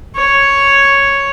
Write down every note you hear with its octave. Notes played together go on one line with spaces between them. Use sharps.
C#5